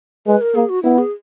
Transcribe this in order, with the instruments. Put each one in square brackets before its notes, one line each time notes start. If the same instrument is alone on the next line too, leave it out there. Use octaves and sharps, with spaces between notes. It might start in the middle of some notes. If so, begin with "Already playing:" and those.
[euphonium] G#3 [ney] B4
[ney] A#4
[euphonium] A#3 [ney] G#4
[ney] F#4
[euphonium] B3 [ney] E4
[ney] G#4